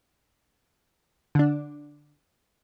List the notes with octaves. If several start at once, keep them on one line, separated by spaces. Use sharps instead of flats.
D3 D4